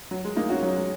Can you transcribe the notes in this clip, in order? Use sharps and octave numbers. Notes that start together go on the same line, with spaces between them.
F#3
G#3
A#3 D#4
C#4 F#4
F#3
G#3